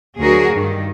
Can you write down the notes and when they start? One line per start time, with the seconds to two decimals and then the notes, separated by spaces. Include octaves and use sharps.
0.19 D2 F#3 F#4 G#4 A#4
0.53 G2 D#3